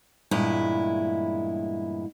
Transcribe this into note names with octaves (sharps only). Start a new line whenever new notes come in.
E2 G2 A#2 G#3 E4